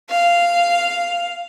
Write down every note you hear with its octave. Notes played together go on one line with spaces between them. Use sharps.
F5